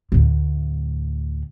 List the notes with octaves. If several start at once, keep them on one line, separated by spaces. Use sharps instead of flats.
D2 A2